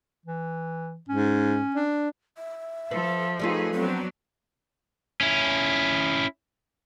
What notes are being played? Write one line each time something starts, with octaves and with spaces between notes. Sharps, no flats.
E3
G#2 C#4
D4
E5
F3 A4 B4
G3 A3 D#4 F4 G#4 B4
F#3 B3 C4 D4
C#4 E4